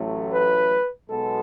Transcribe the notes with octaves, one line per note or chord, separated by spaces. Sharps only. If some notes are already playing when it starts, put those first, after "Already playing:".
Already playing: A1 A2 F#3 A3
B4
B1 B2 G#3 B3 A4